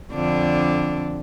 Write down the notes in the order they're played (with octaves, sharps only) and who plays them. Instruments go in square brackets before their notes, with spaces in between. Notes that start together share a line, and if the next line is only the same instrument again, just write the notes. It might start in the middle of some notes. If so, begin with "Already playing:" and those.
[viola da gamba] F2 D3 D4